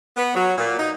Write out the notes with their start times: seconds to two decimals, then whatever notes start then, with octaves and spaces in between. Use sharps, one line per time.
0.17 B3
0.35 F#3
0.58 A#2
0.79 D#4